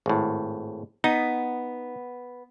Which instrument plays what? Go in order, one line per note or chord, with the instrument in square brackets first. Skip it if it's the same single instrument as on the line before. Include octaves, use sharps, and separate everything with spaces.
[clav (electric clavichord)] G#1 A2
[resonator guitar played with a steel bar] B3 [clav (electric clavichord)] D#4